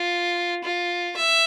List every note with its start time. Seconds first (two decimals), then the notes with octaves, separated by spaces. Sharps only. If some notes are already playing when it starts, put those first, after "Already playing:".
Already playing: F4
0.64 F4
1.16 E5